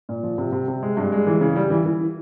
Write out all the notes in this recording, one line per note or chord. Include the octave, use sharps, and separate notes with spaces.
A#2
F3
C3
C3
C3
G#3
G2
G#3
E3
C#3
G3
E3
E3